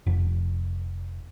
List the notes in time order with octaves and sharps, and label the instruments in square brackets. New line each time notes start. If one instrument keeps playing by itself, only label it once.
[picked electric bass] F1